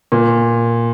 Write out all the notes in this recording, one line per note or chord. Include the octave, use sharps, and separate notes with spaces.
A#2